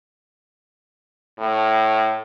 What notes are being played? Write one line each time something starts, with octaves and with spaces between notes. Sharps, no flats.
A2